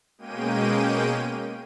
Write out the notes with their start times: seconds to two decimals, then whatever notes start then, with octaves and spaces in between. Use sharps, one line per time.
0.18 B2 G#3 A#3 C#4 G5 D#7